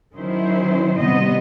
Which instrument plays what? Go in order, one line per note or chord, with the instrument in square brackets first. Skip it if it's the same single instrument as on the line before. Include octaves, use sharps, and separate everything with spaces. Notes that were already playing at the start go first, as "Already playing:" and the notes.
[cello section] D#3 F#3 C#4 E4 C5
C3 G3 B3 D#5